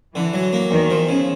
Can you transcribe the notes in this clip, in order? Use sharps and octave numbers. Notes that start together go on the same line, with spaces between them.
D3 E3
F#3
A#3
E2 D#3
F3
C#3